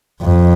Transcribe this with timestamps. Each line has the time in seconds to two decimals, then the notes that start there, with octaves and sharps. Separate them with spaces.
0.22 F2